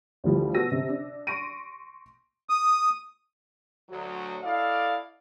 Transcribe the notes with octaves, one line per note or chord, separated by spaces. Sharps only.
D2 E3 F3 G3
B2 F#4 E6 A#6 D#7
C3
D4
C6 C#6 A#6 D7 D#7
D#6
D2 F#3
E4 A4 D5 D#5 F5